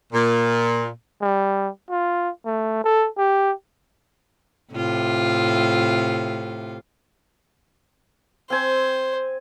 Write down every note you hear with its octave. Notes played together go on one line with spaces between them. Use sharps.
A#2
G3
F4
A3
A4
G4
A2 C3 F4
C4 C5 G#5